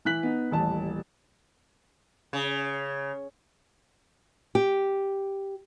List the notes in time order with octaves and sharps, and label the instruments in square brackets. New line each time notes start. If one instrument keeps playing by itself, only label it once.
[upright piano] E3 E4 F#6 B6 F#7
B3 D#4
D#1 A1 A5
[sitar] C#3
[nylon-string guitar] G4